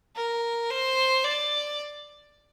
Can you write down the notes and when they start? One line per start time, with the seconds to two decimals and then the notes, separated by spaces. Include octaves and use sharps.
0.16 A#4
0.71 C5
1.25 D5